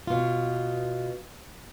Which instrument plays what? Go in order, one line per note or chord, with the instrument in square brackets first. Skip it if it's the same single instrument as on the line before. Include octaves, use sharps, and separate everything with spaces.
[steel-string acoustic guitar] B2 F4